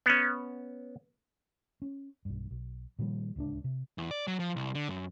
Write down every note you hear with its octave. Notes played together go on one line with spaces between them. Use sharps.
B3 C#4
C#4
B1 G2
B1
A#2 D#3 F3 G3
D1 C#2 C#4 D4
C3
E2
D5
F#3
F3
C2
D3
F#2